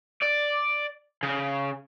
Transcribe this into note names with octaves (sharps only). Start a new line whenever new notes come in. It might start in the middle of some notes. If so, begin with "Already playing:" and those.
D5
C#3